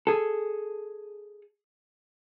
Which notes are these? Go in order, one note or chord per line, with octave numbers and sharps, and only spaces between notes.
G#4 A4